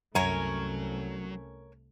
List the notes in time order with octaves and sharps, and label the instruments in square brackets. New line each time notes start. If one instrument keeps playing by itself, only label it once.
[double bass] C2 A3 [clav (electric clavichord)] F#2 [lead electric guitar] F#3 [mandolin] C#4 A#4 C#5